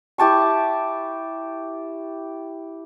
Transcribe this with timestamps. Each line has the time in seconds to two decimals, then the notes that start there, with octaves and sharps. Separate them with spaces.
0.18 E4 G4 A5 C#6